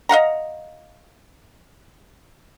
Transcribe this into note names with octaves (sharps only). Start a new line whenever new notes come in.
D#5 F5 F#5 A#5